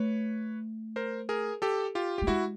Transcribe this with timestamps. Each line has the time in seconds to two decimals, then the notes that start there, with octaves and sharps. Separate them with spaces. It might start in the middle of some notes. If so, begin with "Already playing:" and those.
Already playing: A3 B4 C#5
0.96 A#4 C5
1.29 G#4 A#4
1.62 G4 A4
1.95 F4 G4
2.18 A3 G4
2.27 G#3 E4 F#4